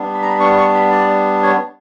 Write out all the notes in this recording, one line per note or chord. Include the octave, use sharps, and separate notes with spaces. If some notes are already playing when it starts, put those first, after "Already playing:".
Already playing: G3 B3 D4
B5
A#5
B5
C#6
C#6
B5
D5
C#5